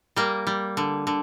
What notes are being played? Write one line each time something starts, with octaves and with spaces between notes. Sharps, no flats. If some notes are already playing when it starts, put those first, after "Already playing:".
G3 A#3
G3
D3
D3